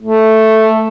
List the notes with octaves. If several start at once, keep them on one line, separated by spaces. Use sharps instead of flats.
A3